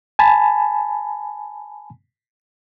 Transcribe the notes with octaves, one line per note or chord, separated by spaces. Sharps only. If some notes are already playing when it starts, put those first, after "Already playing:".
G#5 A5 B5